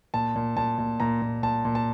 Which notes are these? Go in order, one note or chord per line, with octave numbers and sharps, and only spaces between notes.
A#2 A5
A#2
A#2 A5
A#2
A#2 A#5
A#2
A#2 A5
A#2
A5